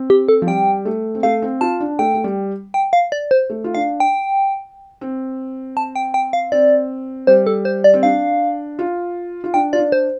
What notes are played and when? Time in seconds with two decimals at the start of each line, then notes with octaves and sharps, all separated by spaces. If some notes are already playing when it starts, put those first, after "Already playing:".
Already playing: C4
0.10 G4
0.28 A4
0.42 F3
0.47 G3 G5
0.85 A3
1.15 C4
1.23 A3 F5
1.42 C4
1.61 F4 A5
1.80 D4
1.99 A3 G5
2.14 A3
2.24 G3
2.74 G5
2.93 F5
3.12 D5
3.31 C5
3.50 A3
3.64 F4
3.75 D4 F5
4.00 G5
5.01 C4
5.77 A5
5.96 G5
6.14 G5
6.33 F5
6.52 C4 D5
7.27 G3 C5
7.47 A4
7.65 C5
7.84 D5
7.94 C4
8.03 D4 F5
8.79 F4
9.44 F4
9.54 D4 G5
9.73 F4 D5
9.79 D4
9.92 C5